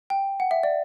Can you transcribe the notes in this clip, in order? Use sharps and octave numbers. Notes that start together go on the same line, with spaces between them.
G5
F#5
E5
D5